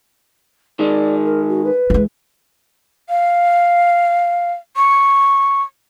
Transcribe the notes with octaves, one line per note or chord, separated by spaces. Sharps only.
D#3 G#3 D5
A#4
F#4
B4
E3 G#3
F5
C#6